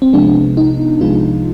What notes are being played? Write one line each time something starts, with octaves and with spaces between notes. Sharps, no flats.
C4
C2 C3 F3 G#3 B3 D4
D#4
C2 C3 F3 G#3 B3 F4